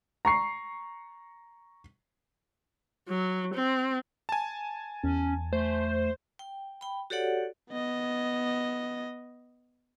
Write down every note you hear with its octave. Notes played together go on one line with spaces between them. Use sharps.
A#5 C#6 C7
F#3
C4
G#5 A5
E2 C#4
A3 C5
G5
G5 B5
F#4 G4 A4 C#5 D5 F#5
B3 D#5